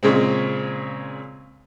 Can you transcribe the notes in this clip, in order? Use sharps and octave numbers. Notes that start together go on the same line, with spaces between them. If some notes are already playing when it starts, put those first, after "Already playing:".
A#2 C#3 G#3 C4